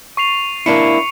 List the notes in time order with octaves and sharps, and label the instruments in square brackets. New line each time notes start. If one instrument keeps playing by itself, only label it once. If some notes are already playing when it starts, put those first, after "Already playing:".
[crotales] C#6 C7 F7
[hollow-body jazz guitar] A#3 D4 E4 [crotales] C#7